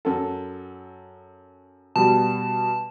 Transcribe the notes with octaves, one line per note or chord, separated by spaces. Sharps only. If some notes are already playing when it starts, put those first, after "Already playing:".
F#2 A4
B2 G3 A5